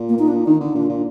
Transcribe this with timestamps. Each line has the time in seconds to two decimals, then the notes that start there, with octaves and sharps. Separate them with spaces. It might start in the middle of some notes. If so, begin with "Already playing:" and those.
Already playing: A#2
0.09 A#3
0.19 D#4
0.28 D4
0.46 D#3 D#4
0.60 D3
0.74 A#2 D4
0.89 A#2